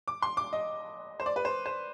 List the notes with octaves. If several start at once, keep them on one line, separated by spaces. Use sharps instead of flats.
D6
C6
D6
D#5
C5
D5
B4
C5
C5